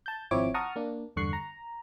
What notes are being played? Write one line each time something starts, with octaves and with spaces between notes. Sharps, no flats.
A5 G6
G#1 F3 C4 E4 C#5 D6
F#5 A5 A#5 C#6 D#6 F6
A#3 D4
E2 G2 D3 C#6 F#6 C7
A#5